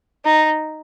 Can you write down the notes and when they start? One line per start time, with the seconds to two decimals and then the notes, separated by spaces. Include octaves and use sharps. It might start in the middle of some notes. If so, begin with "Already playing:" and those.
0.25 D#4